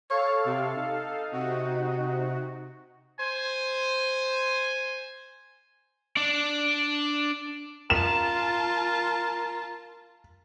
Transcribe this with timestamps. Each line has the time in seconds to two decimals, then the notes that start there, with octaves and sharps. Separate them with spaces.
0.10 A4 C#5 F5
0.46 C3
0.76 D#4
1.32 C3 F#4
3.20 C5 G#5
6.17 D4 D5
7.90 F4 A#4 A5 E7